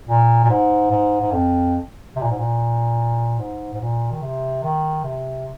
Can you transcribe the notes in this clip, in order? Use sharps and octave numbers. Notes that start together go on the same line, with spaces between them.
A#2
A#2
G#2
G#2
G#2
F2
C3
A#2
G#2
A#2
G#2
G#2
A#2
D#3
C3
D#3
C3